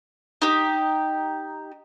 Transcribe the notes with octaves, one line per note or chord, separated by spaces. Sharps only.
D#4 G4